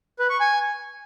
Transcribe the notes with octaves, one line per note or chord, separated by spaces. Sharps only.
B4
C#6
G#5